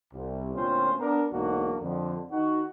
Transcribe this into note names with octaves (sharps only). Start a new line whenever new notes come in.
C2
D2 A#2 C4 C#4 F4 C5
B3 D4 A#4
B1 E2 G#2 A#3 D4 F#4
F2 D3
D#3 D#4 F#4